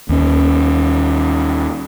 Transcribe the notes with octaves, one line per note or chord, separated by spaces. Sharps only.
D#2 C#4